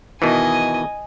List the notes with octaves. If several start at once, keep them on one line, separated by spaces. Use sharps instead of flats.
B2 D#3 E3 D#5 G#5